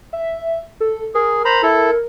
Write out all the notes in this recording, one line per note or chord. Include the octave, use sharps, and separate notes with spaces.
E5
A4
G#4 A#4
C5 A#5 B5
E4 A4